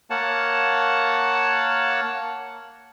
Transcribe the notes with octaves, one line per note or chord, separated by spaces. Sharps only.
A#3 C#5 F#5 A5